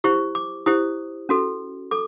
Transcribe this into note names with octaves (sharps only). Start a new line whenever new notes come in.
E4 G4 C5 C#6
D6
E4 G4 C5 D#6
C#4 F#4 A4
A4 D6